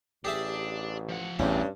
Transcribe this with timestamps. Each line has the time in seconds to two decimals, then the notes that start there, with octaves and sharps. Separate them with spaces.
0.25 A1 D4 G4 G#4 E5
1.09 F3 F#5
1.39 A1 E2 G2 D3 C4 C#4